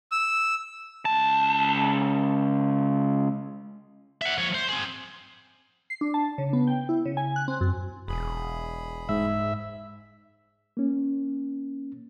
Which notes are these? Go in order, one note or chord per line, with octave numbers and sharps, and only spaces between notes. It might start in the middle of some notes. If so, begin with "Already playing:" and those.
E6
C#2 A5
E5 F#5
F3 C#5
C5
C4 G#4
C7
D4
A5
C#3
B3
G5
E4
C#3
G#5
F#6
C4
F#2
E1 G#4 B5
G#2 E5
A#3 C#4